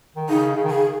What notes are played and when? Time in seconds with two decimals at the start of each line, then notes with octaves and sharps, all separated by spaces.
0.17 D#3
0.29 C#3 D#4
0.56 C#3
0.64 D#3
0.70 C#3 G#4